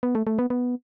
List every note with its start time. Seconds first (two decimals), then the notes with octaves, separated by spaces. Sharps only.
0.03 B3
0.15 A3
0.27 A3
0.39 B3
0.50 B3